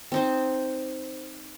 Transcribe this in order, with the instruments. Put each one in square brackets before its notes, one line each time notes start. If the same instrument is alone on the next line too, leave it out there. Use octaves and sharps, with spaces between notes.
[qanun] C4 D#4 C5